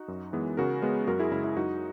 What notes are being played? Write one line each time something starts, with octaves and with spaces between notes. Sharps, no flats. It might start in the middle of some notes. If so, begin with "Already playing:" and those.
Already playing: D#4 F#4
F#2
E3 G#3 B3
C#3 F#4 A#4
G#3 B3
F#2 F#4 A#4
E4 G#4
C#3 G#3 E4
E4
F#2 D#4 F#4